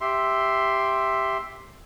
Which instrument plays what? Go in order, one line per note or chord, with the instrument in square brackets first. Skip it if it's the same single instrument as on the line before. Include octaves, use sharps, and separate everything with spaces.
[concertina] G4 E5 C6